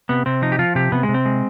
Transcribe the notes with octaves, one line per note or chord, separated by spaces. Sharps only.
C3 B3
C3 C4
F3 D#4
G4
F3 F4
C3 G4
C3 B3
G#3
C3
C4
G#3